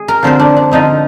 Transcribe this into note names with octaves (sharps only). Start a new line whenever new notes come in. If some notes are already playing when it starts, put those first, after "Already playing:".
Already playing: G#4
A#4
D3 F3 C4 C5
D4
D4
D3 F3 C4 D#4